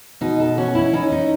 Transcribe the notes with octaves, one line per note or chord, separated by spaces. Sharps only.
B2 D#4
A4
C#4 F#4
E4
C#4 D#4
D#4